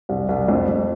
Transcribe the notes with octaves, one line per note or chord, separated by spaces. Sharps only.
C2
C2
F2
F2